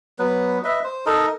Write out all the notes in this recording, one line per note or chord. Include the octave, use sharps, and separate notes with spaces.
F#3 B3 B4
B4 D#5 E5
C5
D#4 A4 A#4 D#5